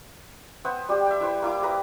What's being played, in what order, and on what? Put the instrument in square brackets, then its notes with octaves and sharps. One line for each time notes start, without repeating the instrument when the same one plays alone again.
[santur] B3 C5 E5 F#5
G3 G4 C5
E5 G5
E4 B4 C5
A#3 E4 D6
B4 A#5 B5 D#6